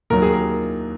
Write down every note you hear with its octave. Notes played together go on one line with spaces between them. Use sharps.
D#2 D#3 F#3 A#4
G#4
A#4